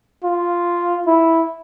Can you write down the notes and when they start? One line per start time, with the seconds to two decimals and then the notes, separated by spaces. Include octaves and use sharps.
0.24 F4
1.07 E4